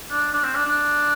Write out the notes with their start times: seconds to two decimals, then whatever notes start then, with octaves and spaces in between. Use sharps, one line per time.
0.11 D4
0.33 D4
0.44 C4
0.55 D4
0.65 D4